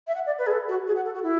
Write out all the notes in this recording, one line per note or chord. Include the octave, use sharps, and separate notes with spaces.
E5
F#5
D5
B4
G#4
A4
F#4
G#4
F#5
A4
F#4
E4